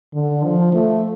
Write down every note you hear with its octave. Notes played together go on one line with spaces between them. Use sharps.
D3
F3
A3